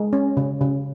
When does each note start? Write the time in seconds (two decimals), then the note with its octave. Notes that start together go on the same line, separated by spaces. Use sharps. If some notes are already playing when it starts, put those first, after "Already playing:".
Already playing: G#3
0.13 C#4
0.37 C#3
0.61 C#3